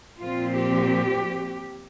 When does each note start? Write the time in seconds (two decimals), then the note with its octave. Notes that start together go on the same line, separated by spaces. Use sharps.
0.20 A#2 F3 C4 F4
0.56 G4